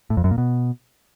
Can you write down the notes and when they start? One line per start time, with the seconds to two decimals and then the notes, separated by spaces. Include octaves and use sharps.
0.10 A2
0.17 F2
0.24 F#2
0.31 A#2
0.38 B2